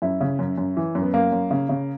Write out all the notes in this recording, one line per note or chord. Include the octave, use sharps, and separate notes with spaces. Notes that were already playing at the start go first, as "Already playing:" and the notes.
F#2 E4
C#3
F#2
F#2
E3
F#2
B3
F#2 A#3
F#2
C#3
C#3